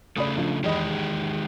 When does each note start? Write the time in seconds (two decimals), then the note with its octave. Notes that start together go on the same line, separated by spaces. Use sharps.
0.17 C#3 A3 D5 B5 D#6
0.37 F3 D4
0.64 E2 D#3 G#3 G4 D#5 B5